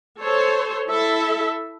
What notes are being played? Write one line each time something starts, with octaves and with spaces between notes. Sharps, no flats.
A4 C5 C#5
E4 A4 E5